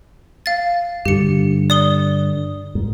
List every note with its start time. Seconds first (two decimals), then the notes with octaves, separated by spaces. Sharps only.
0.46 F5 A6
1.05 G2 D3 G4 C#7
1.70 D5 D#6 G7
2.75 G#2